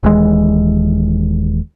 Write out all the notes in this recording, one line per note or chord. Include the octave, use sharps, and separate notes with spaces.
D#1 D#2 E3 G#3